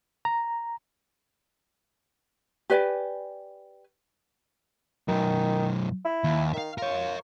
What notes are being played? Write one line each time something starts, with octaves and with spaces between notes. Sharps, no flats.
A#5
G4 B4 D5 G#5
F#2 B2 D#3
E4
D#2
D#3 E5 F5
F4 A#4 C#5